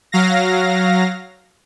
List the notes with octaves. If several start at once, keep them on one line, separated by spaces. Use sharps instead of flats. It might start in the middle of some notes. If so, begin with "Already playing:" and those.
F#3 F5 A#6